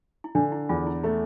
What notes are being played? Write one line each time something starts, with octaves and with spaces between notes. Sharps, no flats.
E4
D3 D4
E4
E2 F4
E4
A3 E4